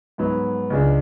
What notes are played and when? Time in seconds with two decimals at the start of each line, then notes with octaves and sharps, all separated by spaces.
0.18 G#2 F#3 B3
0.70 C#2 C#3 G#3 D4